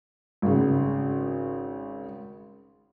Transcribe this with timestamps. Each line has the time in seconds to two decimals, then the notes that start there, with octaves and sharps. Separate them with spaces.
0.42 G#1 C#3